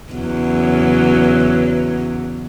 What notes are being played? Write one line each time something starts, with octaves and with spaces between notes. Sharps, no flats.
E2 C#3 F#3